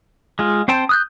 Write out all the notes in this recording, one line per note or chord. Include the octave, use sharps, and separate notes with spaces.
G#3 F4
C4 C5 G5 A5
D#6 F#6 G6